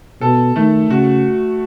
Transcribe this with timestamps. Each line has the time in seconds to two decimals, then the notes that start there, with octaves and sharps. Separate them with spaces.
0.21 B2 A4
0.56 D#3 A3
0.90 C#3 F#4